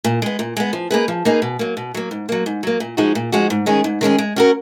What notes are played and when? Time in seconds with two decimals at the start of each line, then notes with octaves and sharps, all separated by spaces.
0.04 A#2
0.22 G#3 B3
0.39 A#2
0.57 G#3 B3
0.73 F3
0.91 A#3 D#4 G#4 B4
1.08 F3
1.25 A#3 D#4 G#4 B4
1.42 B2
1.59 F#3 A#3
1.77 B2
1.94 F#3 A#3
2.11 G#2
2.29 F#3 A#3
2.46 G#2
2.63 F#3 A#3
2.80 A#2
2.97 F3 G#3 D#4 F#4
3.15 A#2
3.32 F3 G#3 D#4 F#4
3.50 G#2
3.66 D#3 G#3 C#4 G#4
3.84 G#2
4.01 D#3 G#3 C#4 G#4
4.18 G#3
4.36 C#4 F#4 A#4